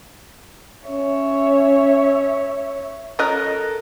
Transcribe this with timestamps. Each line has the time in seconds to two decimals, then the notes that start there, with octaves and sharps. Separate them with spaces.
0.88 C#4 C#5 E5
3.19 C#4 F4 A4 A#4 D#5 F#6